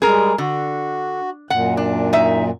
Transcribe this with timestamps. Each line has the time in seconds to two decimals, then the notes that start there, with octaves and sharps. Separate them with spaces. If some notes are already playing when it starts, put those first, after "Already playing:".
0.02 G3 G#3 G#4 A#4
0.38 D3 F#4
1.50 F#2 A#2 F#5
1.77 D4
2.13 D#4 E5